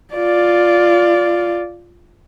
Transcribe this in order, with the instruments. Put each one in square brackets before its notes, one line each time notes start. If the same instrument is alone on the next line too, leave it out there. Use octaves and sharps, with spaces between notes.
[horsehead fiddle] F4 D5